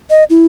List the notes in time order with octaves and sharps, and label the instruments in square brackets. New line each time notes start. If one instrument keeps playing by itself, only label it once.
[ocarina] D#5
E4